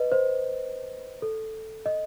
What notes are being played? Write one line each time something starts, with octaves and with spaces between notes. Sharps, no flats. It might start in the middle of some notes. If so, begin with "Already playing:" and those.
Already playing: B4 D#5
C5
A4
D#5